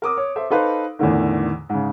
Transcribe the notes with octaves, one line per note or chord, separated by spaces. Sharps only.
A#4 D6 D#6
C#5
A4 C5 E5
D#4 A4 B4 C5 F5
E2 A2 D3 D#3
G#2 C#3